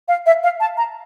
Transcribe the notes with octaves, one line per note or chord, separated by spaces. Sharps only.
F5
E5
F5
A5
A#5